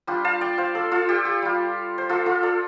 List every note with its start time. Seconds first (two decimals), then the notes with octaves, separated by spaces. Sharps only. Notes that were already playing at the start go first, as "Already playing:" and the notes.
0.07 G3 D4 F4 G4
0.24 F5 A5
0.41 D5 G5
0.58 C5 F5
0.75 A4 D5
0.91 F4 A4
1.09 G4
1.25 G4
1.42 G3 F4
1.98 C5
2.09 F4 A4
2.26 F4 A4
2.43 A4 D5